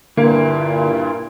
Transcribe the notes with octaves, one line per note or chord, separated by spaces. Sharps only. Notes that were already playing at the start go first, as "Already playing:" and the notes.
G2 A#2 D3 A#3 E4